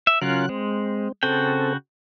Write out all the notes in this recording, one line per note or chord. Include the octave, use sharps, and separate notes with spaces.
E5
C#3 F#3 C#4 F4 A#4 F#6
G#3 C4
C#3 C4 F#4 A4 G5